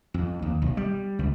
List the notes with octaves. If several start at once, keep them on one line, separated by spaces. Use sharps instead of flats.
F2
D#2
B1
G3
C#2